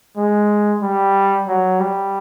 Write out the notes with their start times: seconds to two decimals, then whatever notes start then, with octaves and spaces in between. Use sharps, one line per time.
0.17 G#3
0.82 G3
1.48 F#3
1.80 G3